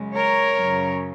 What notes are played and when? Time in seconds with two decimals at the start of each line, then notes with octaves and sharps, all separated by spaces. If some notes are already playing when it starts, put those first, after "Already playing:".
Already playing: F#2 C#3 G#3
0.15 A#4 C#5
0.55 F#2 C#3 F#3